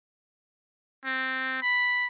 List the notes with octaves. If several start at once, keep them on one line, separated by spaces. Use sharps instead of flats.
C4
B5